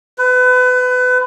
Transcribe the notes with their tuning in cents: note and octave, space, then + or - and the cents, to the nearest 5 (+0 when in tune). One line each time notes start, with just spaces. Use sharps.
B4 +30